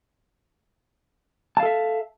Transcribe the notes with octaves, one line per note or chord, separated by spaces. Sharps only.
A4 E5 F5 A5